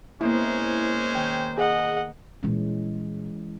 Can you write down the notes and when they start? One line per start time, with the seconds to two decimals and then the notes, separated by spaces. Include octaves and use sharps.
0.21 B2 G#3 A#3 C4 C#4 E4 C5
1.15 D#3 G5 G6
1.58 G#4 D#5 F#5
2.43 A#2 E3 G3 G#3 C#4